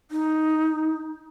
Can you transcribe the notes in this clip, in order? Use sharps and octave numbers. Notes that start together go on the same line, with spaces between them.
D#4